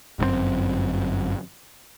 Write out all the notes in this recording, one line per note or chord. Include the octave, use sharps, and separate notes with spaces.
G1 F#2 D3 C4